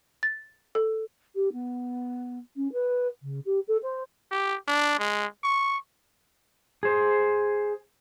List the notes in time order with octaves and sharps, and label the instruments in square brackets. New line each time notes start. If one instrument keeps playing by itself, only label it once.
[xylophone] A6
A4
[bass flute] G4
B3
C#4
B4
C#3
G4
A4
C5
[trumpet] G4
D4
G#3
C#6
[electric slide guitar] G#4 C5